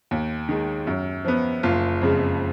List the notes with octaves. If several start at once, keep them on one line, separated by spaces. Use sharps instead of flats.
D#2
D#3 G#3
F#2
F3 B3
F#1 F4
F2 C#3 G#3